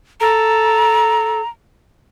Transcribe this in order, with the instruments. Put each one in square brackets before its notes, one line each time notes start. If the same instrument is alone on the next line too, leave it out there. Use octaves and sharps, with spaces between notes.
[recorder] A4 [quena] A#5